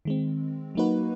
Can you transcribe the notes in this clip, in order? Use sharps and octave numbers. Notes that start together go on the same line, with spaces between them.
D#3 G#3 C4
F#3 A#3 D#4 F#4 B4